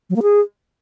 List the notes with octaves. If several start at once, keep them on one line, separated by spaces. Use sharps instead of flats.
F#3
A#3
G#4